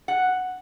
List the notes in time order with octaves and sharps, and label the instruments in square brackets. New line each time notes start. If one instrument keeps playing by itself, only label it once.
[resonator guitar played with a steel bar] F#5